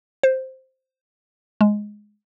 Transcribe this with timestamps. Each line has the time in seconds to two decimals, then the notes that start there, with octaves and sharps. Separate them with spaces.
0.23 C5
1.61 G#3